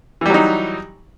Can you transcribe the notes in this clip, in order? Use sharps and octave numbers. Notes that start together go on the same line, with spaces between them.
E3 F#3 G3 D#4